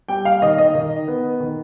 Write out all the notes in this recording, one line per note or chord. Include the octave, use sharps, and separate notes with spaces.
G3 G5
F5
D#3 D#5
D#5
D#3
B3
D#3